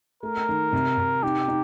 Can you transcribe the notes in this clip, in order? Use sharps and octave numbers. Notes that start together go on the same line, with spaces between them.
A3 A#4
D#3
C3
C3
D#4 G4
D#4